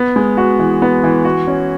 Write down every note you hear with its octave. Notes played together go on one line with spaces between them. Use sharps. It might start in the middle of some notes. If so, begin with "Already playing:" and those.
Already playing: B3
G#3
F#4
E3
B3
E3
F#4
C#4